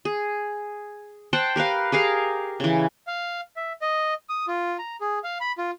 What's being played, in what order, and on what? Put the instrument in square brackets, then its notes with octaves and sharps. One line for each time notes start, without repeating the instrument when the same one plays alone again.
[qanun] G#4
C5 F#5 G5 A5
G4 A#4 B4 F5
G4 G#4 A#4 F5
C#3 E3
[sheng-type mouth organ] F5
E5
D#5
D#6
F4
A#5
G#4
F5
B5
F4